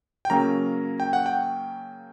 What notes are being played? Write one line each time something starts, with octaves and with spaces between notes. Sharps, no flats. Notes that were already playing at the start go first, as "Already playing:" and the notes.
G5
C#3 F#3 A#3 C#4 A#5
G5
F#5
G5